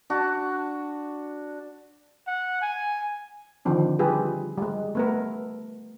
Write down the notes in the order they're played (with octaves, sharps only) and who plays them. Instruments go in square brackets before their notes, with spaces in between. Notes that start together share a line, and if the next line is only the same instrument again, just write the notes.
[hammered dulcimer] D4 F#4
[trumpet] F#5
G#5
[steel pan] D3 D#3 F3 C4 D4
G3 F4 G4 G#4 B4
G3 G#3
A3 B3 A#4